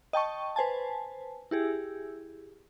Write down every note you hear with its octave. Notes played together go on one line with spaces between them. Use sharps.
D#5 G5 A5 C#6
B4 C5 G#5 A5
E4 G4 G#4